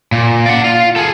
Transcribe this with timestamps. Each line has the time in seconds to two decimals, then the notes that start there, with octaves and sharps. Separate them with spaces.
0.12 A#2
0.46 D5 F#5
0.65 F4
0.96 G#4 A4